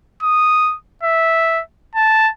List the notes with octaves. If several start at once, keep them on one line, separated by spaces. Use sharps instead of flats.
D#6
E5
A5